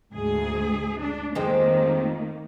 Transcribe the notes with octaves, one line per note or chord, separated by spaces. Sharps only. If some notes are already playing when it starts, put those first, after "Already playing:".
D2 G#2 G#4
D4
F2 D#3 G#3 A#3 C4